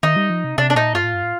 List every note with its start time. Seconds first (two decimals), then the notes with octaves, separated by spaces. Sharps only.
0.03 D#3 D#4
0.16 G3
0.30 F3
0.44 C3
0.58 C3 D4
0.70 D4
0.76 A#2 D#4
0.94 G2 F4
1.04 A2
1.14 G2
1.23 A2